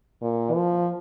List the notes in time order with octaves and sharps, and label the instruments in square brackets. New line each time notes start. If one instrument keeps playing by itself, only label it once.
[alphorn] A#2
F3